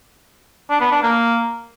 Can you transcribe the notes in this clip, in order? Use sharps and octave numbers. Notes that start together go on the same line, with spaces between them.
D4
B3
D4
A#3